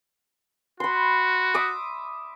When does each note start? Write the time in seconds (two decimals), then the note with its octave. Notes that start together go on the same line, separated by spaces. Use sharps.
0.80 F#4 B5 C6
1.54 E5 D6 D#6